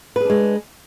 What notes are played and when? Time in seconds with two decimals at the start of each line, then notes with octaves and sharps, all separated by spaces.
0.16 B4
0.20 G#4
0.25 D4
0.30 G#3